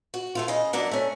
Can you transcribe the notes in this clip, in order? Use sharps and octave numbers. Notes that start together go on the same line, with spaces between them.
F#4
E3 A3 F4
C#3 D#5
F#3 A#3 D4 F#5
A3 C#4